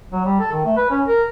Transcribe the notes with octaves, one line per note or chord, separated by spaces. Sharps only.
F#3
G3
A4
D#3
A3
B4
C#4
A#4